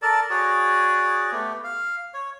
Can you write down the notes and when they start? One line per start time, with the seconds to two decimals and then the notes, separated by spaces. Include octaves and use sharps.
0.02 A4 A#4 D5 A5
0.30 F#4 G#4 C#5 D5
1.32 A3 B3 G4
1.64 F5
2.14 C#5